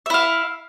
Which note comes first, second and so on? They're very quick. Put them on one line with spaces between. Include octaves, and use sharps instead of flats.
E5 E4 F5